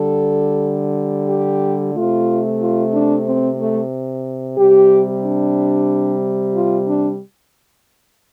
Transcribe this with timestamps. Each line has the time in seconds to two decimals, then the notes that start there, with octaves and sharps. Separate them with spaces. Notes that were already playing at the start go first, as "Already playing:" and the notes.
Already playing: D3 G3 A4
1.28 G4
1.94 C3 A3 F4
2.60 F4
2.93 D4
3.26 C4
3.58 A3
4.57 C3 G3 G4
5.23 D4
6.54 F4
6.86 D4